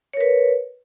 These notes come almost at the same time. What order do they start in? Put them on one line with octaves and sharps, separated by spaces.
C#5 A#4 B4